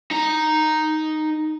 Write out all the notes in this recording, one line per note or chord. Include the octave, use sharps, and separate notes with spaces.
D#4 A#5